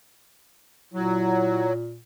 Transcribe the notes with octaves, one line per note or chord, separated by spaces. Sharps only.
A#2 F#3 E4